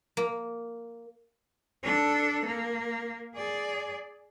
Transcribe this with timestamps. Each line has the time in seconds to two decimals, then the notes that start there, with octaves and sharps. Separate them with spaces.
0.17 A#3
1.83 D4 A4
2.45 A#3
3.35 G#4 D5